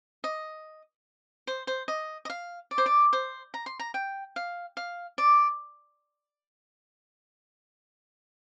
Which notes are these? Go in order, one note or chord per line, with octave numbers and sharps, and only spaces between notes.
D#5
C5
C5
D#5
D#5
F5
D5
C5
D5
C5
A#5
C6
A#5
G5
F5
F5
D5